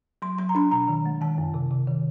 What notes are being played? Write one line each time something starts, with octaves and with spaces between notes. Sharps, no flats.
F#3 C6
F#3 C6
A#5
D4 B5
B2 A#5
D#3
G#3
D#3 A5
F#2
C3
C3
D#3